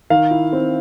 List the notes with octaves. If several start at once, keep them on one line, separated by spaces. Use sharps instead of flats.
D#3 F5
E4
C4